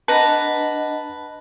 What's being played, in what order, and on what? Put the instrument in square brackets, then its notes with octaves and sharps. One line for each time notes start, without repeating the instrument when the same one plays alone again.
[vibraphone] D4 D#5 F#5 [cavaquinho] B4 A#5 [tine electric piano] A5